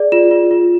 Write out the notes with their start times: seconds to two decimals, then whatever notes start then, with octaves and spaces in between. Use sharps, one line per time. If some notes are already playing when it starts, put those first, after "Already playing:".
Already playing: G#4 D5
0.12 F4 E7
0.31 F4
0.51 F4